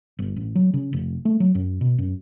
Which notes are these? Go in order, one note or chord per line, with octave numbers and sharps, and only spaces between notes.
G1
A1
F#3
C#3
F1
A3
F#3
F#2
B2
F#2